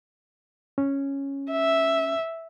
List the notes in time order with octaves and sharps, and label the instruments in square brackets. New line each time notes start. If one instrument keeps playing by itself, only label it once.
[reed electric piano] C#4
[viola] E5